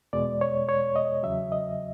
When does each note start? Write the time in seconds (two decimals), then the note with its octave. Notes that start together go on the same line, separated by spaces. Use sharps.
0.13 E2 B2 G#3 D5
0.41 C#5
0.69 C#5
0.96 D#5
1.23 E2 C#3 F#3 E5
1.52 D#5